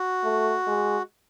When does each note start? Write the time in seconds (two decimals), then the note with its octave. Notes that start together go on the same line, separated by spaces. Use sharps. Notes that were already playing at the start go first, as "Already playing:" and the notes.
Already playing: F#4
0.24 A3
0.67 G#3